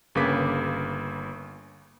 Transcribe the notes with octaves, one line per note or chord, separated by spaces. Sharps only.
G1 C#3 A#3 B4 D6 B6